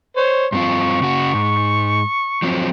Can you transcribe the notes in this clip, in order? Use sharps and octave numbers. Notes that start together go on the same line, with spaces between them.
C5 C#5
G2 C4 F4 C#6
C#3 F#4
G#2
F3 F#3 C4